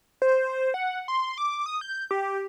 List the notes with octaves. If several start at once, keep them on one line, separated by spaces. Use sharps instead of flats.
C5
F#5
C6
D6
D#6
G6
G4